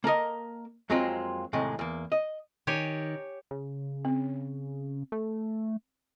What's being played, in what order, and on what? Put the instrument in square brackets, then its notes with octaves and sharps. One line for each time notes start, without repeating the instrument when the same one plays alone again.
[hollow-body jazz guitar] A#3 A4 A#4 D#5
F2 F#3 G#3 A#3 C4 F4
D#2 A2 C3 G#3
E2 A#3
D#5
[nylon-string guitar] D#3 [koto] G4 C#5 G#5
[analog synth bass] C#3
[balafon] C4
[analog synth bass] A3